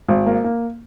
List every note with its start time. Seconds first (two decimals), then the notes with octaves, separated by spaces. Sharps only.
0.08 G#1
0.26 A#3
0.44 A#3